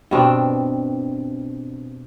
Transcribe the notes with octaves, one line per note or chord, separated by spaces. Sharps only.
G2 B2 C4 D4